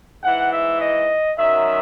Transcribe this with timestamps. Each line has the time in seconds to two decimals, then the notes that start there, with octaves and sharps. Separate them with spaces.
0.22 G#2 E3 F#5
0.51 E5
0.80 D#5
1.37 F#2 D#3 F#3 E5